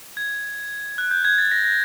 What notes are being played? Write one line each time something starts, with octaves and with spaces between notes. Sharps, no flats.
G#6
F#6
G6
G#6
A6
A#6
A#6